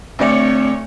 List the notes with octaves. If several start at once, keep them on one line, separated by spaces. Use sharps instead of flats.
D2 A3 C4 C#5 D5